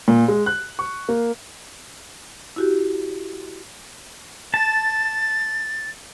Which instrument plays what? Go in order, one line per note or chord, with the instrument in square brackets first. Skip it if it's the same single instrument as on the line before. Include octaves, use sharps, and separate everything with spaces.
[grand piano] A#2
G#3
F#6
C#6
A#3
[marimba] E4 F#4 G4
[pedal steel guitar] A5 [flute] A6